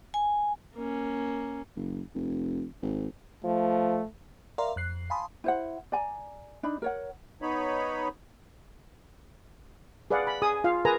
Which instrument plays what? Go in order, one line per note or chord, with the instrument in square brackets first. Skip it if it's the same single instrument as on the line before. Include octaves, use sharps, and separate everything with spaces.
[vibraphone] G#5
[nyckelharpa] A#3 C#4
[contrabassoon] F#1
F1
G#1
[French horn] F3 [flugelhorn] A3
[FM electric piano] A#4 D5 E5 F5 A#5 C6
F2 F#6 C7
F5 G#5 A5 B5 C6 D#6
[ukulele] E4 C5 F#5
D5 G#5 A#5
D4 D#4 B5
A#4 C#5 F#5
[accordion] B3 D#4 C#5 B5
[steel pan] G#4 B4 D5 F5 F#5
B5
G#4 G#5 D#6
F4 F5
G#4 A#4 B4 G#5 A#5